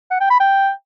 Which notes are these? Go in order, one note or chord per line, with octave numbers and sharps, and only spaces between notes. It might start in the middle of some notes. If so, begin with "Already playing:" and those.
F#5
G5
B5
G5